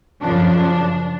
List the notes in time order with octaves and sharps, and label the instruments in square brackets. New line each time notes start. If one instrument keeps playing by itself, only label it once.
[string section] F#2 C#3 F3 D4